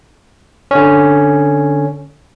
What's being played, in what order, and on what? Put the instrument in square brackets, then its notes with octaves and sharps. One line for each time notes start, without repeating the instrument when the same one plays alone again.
[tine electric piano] D3 C#4